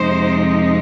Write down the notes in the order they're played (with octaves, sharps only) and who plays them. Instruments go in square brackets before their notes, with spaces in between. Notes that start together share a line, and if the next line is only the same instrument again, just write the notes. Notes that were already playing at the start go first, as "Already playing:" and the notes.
Already playing: [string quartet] F2 C3 G#3 C4 D#4 C5